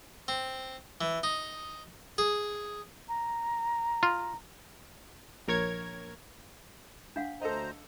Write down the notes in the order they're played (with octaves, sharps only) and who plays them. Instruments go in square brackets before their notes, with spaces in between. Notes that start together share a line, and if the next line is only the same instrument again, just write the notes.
[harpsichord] C4
E3
D#4
G#4
[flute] A#5
[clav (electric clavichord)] F4
[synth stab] A#1 A#4 C#5 G#6
[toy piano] D4 F5 F#5
[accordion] D2 C5 A#5 [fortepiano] A4 D#5